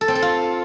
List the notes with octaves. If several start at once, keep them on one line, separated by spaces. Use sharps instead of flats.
A4
C4
A4
F4